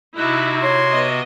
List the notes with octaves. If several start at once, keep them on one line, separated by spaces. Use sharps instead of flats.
C3 D#4 E4 F#4 F#6
C#5 C6
B3 D#5